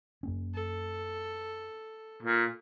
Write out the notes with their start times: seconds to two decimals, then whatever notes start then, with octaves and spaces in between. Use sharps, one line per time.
0.23 F#2 A#3 C#4
0.54 A4
2.22 A#2